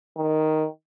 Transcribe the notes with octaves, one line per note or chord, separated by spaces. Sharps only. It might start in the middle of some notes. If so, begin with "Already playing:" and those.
D#3